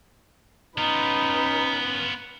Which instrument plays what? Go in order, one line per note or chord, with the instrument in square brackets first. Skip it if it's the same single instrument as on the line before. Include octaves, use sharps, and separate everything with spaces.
[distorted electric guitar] B3 F4 [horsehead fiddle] C#4 B4 [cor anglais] D#4